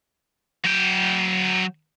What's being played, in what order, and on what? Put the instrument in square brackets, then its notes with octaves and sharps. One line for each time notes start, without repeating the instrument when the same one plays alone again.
[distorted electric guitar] F#3 G5